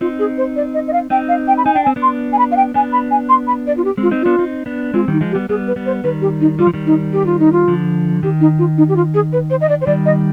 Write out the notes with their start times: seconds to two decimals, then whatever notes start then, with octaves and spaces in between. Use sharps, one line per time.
0.01 C4 D#4 F4
0.19 G#4
0.38 C5
0.56 D5
0.74 D#5
0.88 D#5
0.93 F5
1.10 C4 D#4 G5
1.29 F5
1.48 G5
1.58 B5
1.65 D#4 G#5
1.74 D4 G5
1.84 G#5
1.87 C4
1.96 B3 D4
2.02 C6
2.33 G#5
2.38 B5
2.51 F5
2.56 G5
2.74 B3 D4 G#5
2.93 B5
3.11 G#5
3.29 C6
3.47 B5
3.67 D5
3.77 F4
3.84 G4
3.97 G#3 C4 F4
4.11 C4 D#4
4.22 B3 D4 F4
4.39 C4 D#4
4.66 B3 D4
4.94 G#3 C4 F4
5.08 D#3 G3 D#4
5.21 F3 G#3
5.31 G4
5.35 G3 B3
5.49 G3 B3 G#4
5.67 B4
5.76 G3 B3
5.86 C5
6.04 D#3 G3 B4
6.22 G4
6.41 D#4
6.59 G3 F4
6.67 F3
6.74 D#3 G3
6.86 D#4
7.12 G4
7.26 F4
7.39 D#4
7.52 F4
7.68 D3 F3
8.23 D#3 G4
8.40 D#4
8.59 F4
8.77 D#4
8.89 G4
8.96 F4
9.14 G#4
9.32 B4
9.50 C5
9.61 D#5
9.69 D5
9.81 C5
9.86 D#3 G3 D5
10.05 D#5